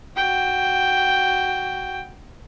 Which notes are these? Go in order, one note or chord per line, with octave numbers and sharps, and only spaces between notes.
F#4 G5